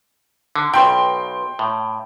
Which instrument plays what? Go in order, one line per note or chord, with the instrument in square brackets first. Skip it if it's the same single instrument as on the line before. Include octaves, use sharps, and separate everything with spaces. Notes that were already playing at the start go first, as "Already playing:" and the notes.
[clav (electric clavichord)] D3
[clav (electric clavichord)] B1 B2 [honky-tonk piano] G5 C6
[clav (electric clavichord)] A2